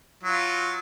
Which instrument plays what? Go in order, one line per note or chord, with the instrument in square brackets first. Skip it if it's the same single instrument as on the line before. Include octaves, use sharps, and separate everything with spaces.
[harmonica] F#3 F4